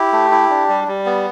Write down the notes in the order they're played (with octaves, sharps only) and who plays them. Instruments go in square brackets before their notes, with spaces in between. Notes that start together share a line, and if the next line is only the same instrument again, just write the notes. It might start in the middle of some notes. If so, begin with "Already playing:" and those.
Already playing: [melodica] E4 G4
A3
E4
D4
G3
G3
B3